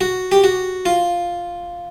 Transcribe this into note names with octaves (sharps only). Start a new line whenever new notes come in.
F#4
G4
F#4
F4